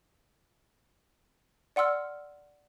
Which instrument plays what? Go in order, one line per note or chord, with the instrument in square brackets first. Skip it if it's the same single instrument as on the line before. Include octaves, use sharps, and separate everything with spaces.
[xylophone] D5 F#5 C6 E6 F6